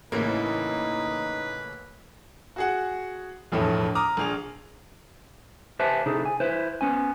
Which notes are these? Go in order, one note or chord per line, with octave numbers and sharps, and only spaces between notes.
A1 A2 C#3 A#3 D#4 B4
F#4 G#4 F#5
E1 A#1 F2 A2 E3 A3
A#5 D6 D#6 F6
A#1 G#4 F7
G4 B4 C5 E5 G#5 A5
C3 D#4 E4 G#4 A4
G#5
E4 B4 C5
B3 C#4 G#5